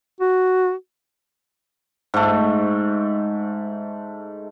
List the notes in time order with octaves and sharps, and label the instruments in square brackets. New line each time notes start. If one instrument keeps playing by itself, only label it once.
[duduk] F#4
[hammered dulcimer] G#2 A3